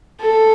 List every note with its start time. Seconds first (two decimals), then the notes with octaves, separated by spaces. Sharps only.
0.21 A4